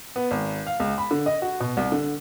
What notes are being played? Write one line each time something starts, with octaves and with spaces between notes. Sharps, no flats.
B3
G#1
F5
C#2
B5
D3
D#5
F#4
B2
C2
D3